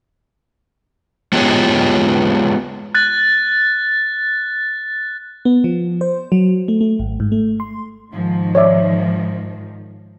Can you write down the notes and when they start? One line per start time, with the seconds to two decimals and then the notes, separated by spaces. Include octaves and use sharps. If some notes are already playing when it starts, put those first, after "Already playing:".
1.33 G#3 B3 F4 G4 G#4 C#5
2.95 F#6 A6
5.45 B3
5.64 F3
6.01 C5
6.32 F#3
6.68 A3
6.81 A3
6.99 G#1
7.20 G#2
7.32 A3
7.60 C6
8.11 G#2 D#3 F3
8.55 C#5 D5 E5